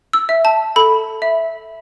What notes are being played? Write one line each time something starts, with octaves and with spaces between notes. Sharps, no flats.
E6
E5
A5
A4 B5
E5